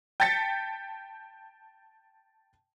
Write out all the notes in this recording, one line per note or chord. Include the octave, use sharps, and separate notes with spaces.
G5 A5 G6 A6 B6 C#7